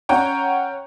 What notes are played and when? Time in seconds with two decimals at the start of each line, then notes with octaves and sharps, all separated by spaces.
0.09 C#4 C#5 F#5 G5 A#5